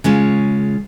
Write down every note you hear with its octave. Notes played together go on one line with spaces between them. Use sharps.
C#3 G#3 C#4 F4